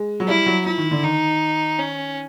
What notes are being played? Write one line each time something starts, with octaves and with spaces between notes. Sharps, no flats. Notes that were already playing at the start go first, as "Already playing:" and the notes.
Already playing: G#3
F#3
G3 E4
F#3
F3 E4
D#3
D3
D#3 D#4
C#4